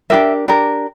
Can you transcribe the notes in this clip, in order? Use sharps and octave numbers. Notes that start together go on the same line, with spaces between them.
D4 G4 A#4 E5
D4 G4 A#4